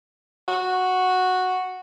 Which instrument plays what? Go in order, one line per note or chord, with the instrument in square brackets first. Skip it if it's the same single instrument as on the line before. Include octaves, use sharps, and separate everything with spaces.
[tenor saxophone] F#4